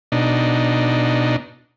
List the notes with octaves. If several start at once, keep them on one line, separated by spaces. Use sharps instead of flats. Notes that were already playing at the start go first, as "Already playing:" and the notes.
B2 D4 D#4